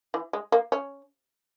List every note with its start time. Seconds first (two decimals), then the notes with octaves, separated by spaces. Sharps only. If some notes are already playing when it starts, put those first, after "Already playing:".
0.14 E3
0.33 G#3
0.52 A#3
0.72 C#4